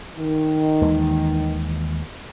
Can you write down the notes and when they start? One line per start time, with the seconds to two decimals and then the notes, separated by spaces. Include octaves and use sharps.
0.18 D#3
0.81 D#2 E3 G#3